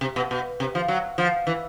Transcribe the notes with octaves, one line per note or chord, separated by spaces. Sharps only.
C3
B2
B2
C3
F3
F#3
F3
E3